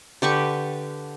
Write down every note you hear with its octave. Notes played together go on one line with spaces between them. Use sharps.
D3 G4 B4 C#6